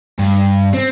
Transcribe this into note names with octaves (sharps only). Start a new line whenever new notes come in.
G2
C4